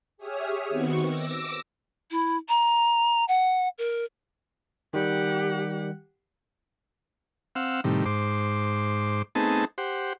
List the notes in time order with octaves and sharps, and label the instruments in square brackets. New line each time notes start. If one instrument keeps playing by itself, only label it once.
[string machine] G4 G#4 C#5 E5 D#6 F6
D#3 B3 C4 F#4 C#6
D6 E6 A#6
[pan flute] E4
A#5
F#5
A#4
[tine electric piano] D#3 G3 [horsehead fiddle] G4 F#5
[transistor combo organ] C4 F5 F#5 E6
A2 C3 D#3 G3
G#2 C5 D6
A3 B3 C4 D#4 G#4 A5
G4 C5 F#5